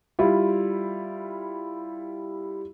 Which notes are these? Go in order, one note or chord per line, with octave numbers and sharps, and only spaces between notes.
G3 E4 F4